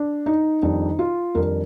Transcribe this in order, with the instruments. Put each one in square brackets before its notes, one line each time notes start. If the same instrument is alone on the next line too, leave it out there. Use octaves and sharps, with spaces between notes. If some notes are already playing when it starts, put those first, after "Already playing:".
Already playing: [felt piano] D4
D#4
[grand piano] F2 D#3 G3 D4 [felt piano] D#4
[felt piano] F4
[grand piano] F2 D#3 G3 D4 [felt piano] A#4